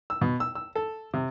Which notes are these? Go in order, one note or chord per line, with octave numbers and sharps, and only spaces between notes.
E6
B2
E6
E6
A4
C3